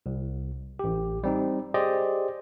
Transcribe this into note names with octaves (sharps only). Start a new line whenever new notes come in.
C2
A1 G4
G3 C4 D#4
G4 G#4 C5 D5 D#5